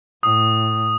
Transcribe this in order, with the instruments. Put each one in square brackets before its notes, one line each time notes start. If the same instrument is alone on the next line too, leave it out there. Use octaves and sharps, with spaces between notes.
[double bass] A2 [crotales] D#6